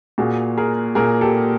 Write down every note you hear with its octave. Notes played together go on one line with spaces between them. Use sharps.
A#2 F#4 G#4
G#4 A#4
A#2 G#4 A#4
G4 A4